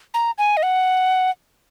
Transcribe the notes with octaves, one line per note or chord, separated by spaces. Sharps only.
A#5
G#5
D#5
F#5